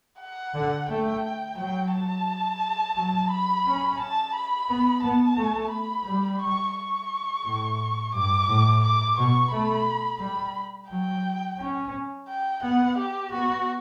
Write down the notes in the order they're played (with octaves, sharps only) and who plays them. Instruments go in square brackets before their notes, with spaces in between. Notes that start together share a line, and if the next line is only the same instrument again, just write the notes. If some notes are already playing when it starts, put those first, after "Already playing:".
[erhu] F#5
[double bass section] D3
[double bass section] A3 [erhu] G5
[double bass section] F#3 [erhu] G5
[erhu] A5
[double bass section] F#3
[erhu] B5
[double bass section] C#4
[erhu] A5
B5
[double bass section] B3
[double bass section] B3 [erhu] A5
[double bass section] A3
[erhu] B5
[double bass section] G3
[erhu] C#6
C#6
[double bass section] A2
[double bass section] G2 [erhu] D6
[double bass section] A2
[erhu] D6
[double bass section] B2 [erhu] C#6
[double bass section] A3 [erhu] B5
[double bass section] G3 [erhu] B5
[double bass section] F#3 [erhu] G5
[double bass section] C#4
[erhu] G5
[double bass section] B3 [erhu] F#5
[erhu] G4
[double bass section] B3 [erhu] F#4